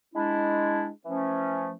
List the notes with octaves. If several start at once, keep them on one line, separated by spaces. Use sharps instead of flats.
G#3 D4 E4
E3 F3 A3 C#4